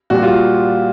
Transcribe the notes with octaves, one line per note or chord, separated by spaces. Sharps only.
A#2 G3 F#4
F4